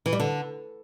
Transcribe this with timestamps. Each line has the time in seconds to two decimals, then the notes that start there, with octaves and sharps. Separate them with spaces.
0.06 E3
0.13 G3
0.20 D3